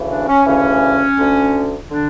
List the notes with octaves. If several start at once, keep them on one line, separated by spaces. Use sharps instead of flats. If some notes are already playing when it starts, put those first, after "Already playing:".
Already playing: D2 C#3 E3
D4
C#4
D2 C#3 E3 C#4
D2 D3
D3 D4